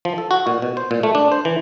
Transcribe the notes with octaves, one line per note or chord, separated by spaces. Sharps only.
F3
A4
F#4
A#2
B2
C5
A#2
A3
D4
C5
E3